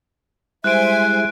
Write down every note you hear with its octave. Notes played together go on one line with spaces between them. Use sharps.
G3 G#3 E4 C5 E5 G#5 F#6 D7